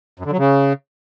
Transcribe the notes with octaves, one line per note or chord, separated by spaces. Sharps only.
F#2
D3
F#3
C#3